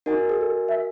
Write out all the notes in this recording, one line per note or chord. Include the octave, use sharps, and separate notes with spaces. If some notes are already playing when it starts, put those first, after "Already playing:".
D#4 F#4 A#4 D#5 G#5
G#4
A4
E5